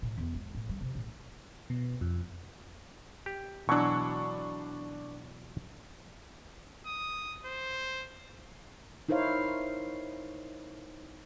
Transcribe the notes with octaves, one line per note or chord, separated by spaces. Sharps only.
A2
E2
G#3
A2
G3
C3
A1
B2
F2
G4
B2 E3 F#3 D4 C#6
D#6
C5
D#4 E4 A#4 C5 C#5 F5